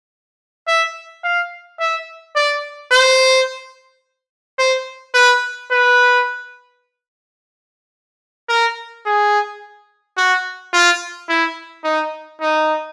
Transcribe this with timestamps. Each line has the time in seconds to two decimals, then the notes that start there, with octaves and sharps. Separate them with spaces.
0.68 E5
1.24 F5
1.80 E5
2.36 D5
2.91 C5
4.59 C5
5.14 B4
5.71 B4
8.49 A#4
9.06 G#4
10.17 F#4
10.73 F4
11.29 E4
11.84 D#4
12.41 D#4